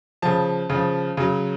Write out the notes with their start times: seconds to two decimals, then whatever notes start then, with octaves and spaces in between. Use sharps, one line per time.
0.22 C#3 F3 A5
0.70 C#3 F3
1.17 C#3 F#3